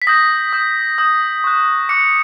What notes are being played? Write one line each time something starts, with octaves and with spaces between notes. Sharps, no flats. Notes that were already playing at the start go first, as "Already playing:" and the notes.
B6
D#6 G6 A#6
D#6 G6
D#6 G6
C#6 F#6
D6 F#6 C#7